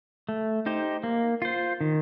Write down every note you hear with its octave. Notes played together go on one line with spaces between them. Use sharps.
A3
D#4 G4 C5
A#3
F4 C5
D#3